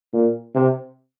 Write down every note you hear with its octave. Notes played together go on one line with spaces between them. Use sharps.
A#2
C3